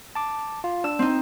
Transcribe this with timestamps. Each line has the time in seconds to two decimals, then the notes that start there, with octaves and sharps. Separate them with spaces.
0.15 A5 D6
0.64 F4
0.84 D4 E6
0.99 C4 D#4